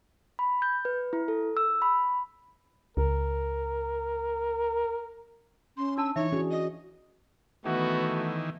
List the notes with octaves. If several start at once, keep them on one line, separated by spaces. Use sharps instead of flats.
B5
G6
B4
E4
A4
E6
B5
C#2 A#4
C#4 C6
D4 A5 E6
E3 D#4 C#5 E5
C#4 D4 F#4 G#4
D#5
D#3 E3 A3 B3 F#4